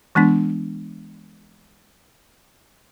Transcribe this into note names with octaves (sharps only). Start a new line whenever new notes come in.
E3 G#3 B3 D4